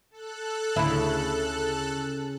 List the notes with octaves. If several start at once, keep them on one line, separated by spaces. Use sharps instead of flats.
A4 F#6
D2 C#3 E4